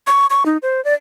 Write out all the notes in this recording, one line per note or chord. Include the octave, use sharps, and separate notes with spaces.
C#6
C#6
D#4
C5
D5